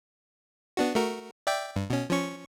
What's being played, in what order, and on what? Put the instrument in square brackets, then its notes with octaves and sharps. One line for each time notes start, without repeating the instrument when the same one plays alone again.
[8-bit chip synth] B3 D4 F#4
A3 F#4 A#4
D5 E5 G5
G2
B2 C#4
F3 C#4 C#6